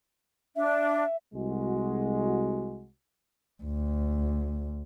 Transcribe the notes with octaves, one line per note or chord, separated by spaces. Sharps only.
D4 E5
C2 G#3 F#4
D2